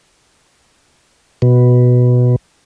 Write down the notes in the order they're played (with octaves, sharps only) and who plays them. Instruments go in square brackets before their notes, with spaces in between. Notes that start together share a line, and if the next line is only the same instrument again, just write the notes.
[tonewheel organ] B2